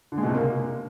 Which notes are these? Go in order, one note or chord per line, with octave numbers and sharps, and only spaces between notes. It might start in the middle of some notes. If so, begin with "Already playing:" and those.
D3
G#3
B2
C3
A#3